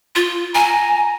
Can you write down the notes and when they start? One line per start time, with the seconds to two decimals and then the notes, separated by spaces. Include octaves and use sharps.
0.16 F4
0.55 G#5 A#5